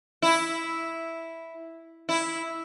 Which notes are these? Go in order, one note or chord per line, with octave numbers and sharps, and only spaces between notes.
E4
E4